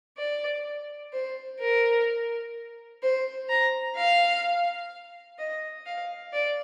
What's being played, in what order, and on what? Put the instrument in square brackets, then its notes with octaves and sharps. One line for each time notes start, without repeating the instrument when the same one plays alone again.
[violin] D5
C5
A#4
C5
A#5
F5
D#5
F5
D5